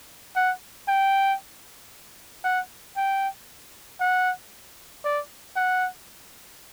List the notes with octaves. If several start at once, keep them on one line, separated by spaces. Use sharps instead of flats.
F#5
G5
F#5
G5
F#5
D5
F#5